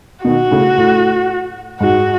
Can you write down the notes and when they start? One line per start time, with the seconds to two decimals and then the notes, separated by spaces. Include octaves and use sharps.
0.25 B2 D#3 F#4
0.51 A2 C#3
0.77 A2
1.80 G#2 F#4